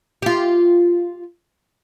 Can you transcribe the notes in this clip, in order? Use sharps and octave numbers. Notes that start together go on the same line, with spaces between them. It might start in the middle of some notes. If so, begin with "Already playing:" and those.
F4 G4